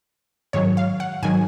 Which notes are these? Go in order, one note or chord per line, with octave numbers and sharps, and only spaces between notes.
G#2 D#3 F#3 C#5
F5
F#5
G#2 D#3 F#3 G#5